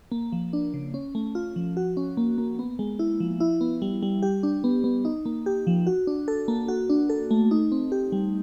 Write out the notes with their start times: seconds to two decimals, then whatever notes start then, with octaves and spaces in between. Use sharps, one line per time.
0.12 A#3
0.32 F3
0.53 D4
0.74 C#3
0.94 C#4
1.15 A3
1.35 F4
1.56 F3
1.77 F#4
1.97 C#4
2.17 A#3
2.38 A#3
2.59 B3
2.79 G#3
2.99 E4
3.20 F3
3.40 E4
3.61 B3
3.82 G3
4.03 G3
4.23 G4
4.43 D4
4.64 B3
4.84 B3
5.05 D#4
5.25 A#3
5.46 G4
5.67 F3
5.87 F#4
6.07 D4
6.28 A4
6.48 A#3
6.68 F#4
6.90 D4
7.09 A4
7.31 A3
7.51 D#4
7.72 C4
7.92 G4
8.12 G3